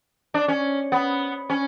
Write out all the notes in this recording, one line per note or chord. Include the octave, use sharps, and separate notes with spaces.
D4
C#4
B3
C#4